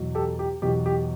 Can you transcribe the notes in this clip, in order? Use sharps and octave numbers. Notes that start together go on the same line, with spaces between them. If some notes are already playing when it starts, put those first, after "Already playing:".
Already playing: E2 B2 F#3
G4 A4
G4
E2 B2 F#3 G4
G4